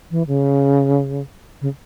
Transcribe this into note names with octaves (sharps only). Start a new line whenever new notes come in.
E3
C#3
C#3